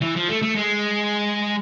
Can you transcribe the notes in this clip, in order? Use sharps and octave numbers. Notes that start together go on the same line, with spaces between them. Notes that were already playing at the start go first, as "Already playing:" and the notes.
E3
F3
A3
A3
G#3